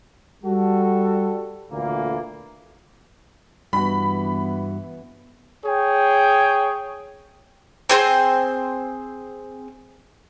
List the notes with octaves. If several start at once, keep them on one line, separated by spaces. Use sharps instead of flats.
G3 F#4 A4
D2 A#2 D3 E3 A#3
G2 E3 B3 F#4 B5
G#4 C#5 G5
C4 G#4 C5